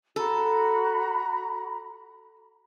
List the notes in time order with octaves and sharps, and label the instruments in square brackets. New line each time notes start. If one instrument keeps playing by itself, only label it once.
[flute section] F#4 A#5 B5 [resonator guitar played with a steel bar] A4